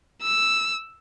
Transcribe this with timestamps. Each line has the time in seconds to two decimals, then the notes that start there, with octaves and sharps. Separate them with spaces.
0.22 E6